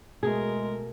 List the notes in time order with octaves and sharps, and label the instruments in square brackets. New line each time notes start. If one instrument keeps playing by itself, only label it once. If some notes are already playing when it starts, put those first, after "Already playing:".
[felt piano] B2 A3 [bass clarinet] G#3 [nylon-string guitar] G#4 [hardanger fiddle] A#4